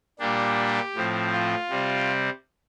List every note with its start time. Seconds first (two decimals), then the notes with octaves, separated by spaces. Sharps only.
0.19 A#2 G3 A#3 D4 G4
0.95 A2 F3 C4
1.33 F4
1.70 C3 G3 C4